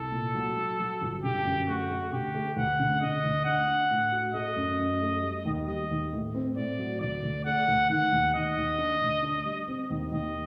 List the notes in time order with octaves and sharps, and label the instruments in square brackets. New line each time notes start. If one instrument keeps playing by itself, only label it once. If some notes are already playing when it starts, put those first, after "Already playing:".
Already playing: [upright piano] C2 [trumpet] A4
[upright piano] A#2
F#3
F#3
F#3
G1
[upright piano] D3 [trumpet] G4
[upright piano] F#2
[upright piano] A3 [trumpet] F#4
[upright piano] A3
[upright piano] D3 [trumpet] G4
[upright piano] A3
[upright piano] D2 [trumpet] F#5
[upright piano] D3
[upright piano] D3 [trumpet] D#5
[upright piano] D2
[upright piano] D4 [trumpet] F#5
[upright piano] D4
A2
F#4
[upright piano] A3 [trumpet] D#5
[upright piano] F#2
F#2
A3
G3
D#2
[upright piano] G3 [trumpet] D#5
[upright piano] D#2
A2
C4
[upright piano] A2 [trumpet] D5
[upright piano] F#3
[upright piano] D2 [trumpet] D5
[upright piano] D2
[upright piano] A3 [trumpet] F#5
[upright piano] D2
[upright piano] D#3 [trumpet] F#5
[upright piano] D#2
[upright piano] D#3 [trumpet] D#5
[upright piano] D#2
D4
D2
D4
G3
C4
D#2
[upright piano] D#2 [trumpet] D#5